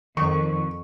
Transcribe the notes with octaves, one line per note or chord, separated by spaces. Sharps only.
F2 D#3 C#6